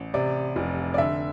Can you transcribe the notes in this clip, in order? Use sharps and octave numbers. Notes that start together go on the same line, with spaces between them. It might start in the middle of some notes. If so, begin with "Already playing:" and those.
Already playing: A1
C3 D5
F1
D5
D3 E5